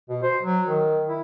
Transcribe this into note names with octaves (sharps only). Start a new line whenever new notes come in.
B2
C5
F#3
D#3
E4